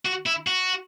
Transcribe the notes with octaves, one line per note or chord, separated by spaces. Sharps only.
F#4
E4
F#4